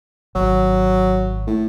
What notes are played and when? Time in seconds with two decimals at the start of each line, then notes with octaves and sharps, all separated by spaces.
0.35 G#1 F#3
1.47 A2